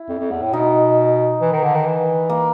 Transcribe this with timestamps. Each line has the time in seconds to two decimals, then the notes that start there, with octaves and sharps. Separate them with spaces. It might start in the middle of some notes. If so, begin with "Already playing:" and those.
Already playing: E4
0.09 F2
0.19 F2
0.31 E2
0.42 A2
0.53 B2 D#4
1.41 E3
1.52 D#3
1.63 D3
1.75 D#3
1.85 E3
2.29 A#3